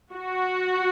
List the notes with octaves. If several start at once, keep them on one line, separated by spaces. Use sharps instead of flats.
F#4